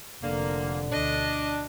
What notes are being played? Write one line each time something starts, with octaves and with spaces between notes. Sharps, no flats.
F1 D3 A#3
D2 B2 D4 D#5